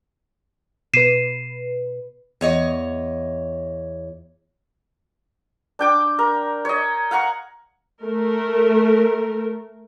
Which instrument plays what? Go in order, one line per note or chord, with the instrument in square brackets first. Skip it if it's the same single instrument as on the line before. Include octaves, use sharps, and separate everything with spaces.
[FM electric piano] B2 B4 [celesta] C7 D#7 E7
[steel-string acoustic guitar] E2 C#5 D#5
[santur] D4 G5 D6
A#4
C#5 D#5
F5 F#5 A#5 C#6
[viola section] A3 A#4